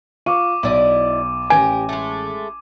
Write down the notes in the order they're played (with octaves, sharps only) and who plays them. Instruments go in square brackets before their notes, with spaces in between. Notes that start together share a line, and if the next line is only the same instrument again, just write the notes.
[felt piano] F4 F5 C#6 [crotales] D6 D#7
[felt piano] B1 [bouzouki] E4 D5 D#5
[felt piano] A1 G#6 [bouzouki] G4 A#4 [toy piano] G#5
[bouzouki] G#3 A3